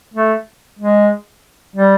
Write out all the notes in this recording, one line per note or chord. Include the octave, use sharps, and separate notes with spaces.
A3
G#3
G3